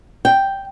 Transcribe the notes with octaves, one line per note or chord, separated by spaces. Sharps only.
G5